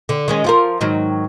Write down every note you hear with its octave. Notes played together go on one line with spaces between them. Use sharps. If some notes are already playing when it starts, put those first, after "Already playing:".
D3
D#3 G#3 C#4
F3 F4 A#4
G#2 D#3 F#3